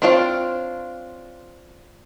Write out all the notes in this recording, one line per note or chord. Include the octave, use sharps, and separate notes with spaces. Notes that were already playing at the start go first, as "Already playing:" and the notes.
C4 D4 F4 C#5 F5